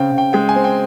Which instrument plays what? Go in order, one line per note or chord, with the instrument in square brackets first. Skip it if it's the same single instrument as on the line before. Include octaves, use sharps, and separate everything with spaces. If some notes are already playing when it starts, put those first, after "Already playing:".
Already playing: [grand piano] C#3 C4 G5
C#3
G5
G#3 G5
G#5
C4
G5